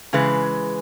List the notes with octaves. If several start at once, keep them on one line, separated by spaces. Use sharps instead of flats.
C#3 E3 G#3 B4